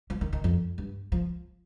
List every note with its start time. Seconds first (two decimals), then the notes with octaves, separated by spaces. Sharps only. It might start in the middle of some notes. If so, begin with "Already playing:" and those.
0.10 F3
0.21 D#3
0.33 D#3
0.44 F2
0.78 G2
1.12 F3